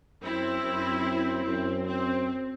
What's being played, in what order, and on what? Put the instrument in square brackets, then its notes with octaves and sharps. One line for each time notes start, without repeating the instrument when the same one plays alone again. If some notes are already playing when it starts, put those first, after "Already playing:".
[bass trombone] F#2 [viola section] C4 E4
[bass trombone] F#2
[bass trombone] F#2 [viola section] C4
[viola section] C4